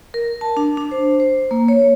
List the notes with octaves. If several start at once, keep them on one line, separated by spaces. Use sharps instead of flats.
A#4
A5
D4
D4
C5
C5
A#3
C#5